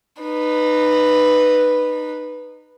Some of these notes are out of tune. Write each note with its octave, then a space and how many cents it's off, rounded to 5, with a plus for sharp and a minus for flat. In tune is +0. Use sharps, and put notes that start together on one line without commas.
D#4 -25 B4 +0